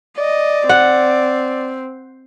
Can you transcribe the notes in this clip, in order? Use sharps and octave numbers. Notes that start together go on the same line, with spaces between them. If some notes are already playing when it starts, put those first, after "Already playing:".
D5 D#5
C4 F#5